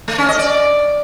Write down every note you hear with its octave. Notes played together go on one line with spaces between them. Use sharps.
A3
C#4
D#5
D5